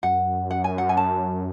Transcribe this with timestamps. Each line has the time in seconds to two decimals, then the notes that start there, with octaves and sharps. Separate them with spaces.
0.03 F#2 F#5
0.51 F#5
0.64 G#5
0.78 F#5
0.89 G#5
0.97 A5